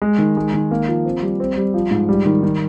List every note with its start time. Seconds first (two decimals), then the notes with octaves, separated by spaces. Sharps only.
0.02 G#3
0.18 D#3
0.37 G#3
0.54 D#3
0.71 A#3
0.88 F3
1.05 C4
1.22 G3
1.40 C4
1.57 G3
1.74 F3
1.91 G#2
2.09 G3
2.26 D#3
2.43 D#3